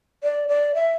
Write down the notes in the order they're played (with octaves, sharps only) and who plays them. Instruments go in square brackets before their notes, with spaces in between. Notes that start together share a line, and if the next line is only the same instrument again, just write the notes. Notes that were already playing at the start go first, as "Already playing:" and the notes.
[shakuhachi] D5
D5
E5